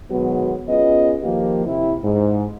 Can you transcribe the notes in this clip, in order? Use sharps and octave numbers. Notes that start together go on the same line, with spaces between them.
B2 D#3 F#3 G#3 B3
B3 C#4 F4 G#4 D#5
D#3 F3 A#3 F4 G4
C3 E4
G#2